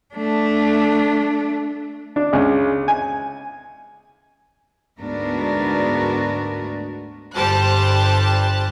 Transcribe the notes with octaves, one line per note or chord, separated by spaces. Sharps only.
A3 D4
D4
C#2
G#5
D2 G#2 B3 D4 F#4 A#4
G1 G3 G4 C5 A5 F#6